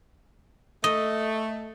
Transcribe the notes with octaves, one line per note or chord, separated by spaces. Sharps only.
A3 D#5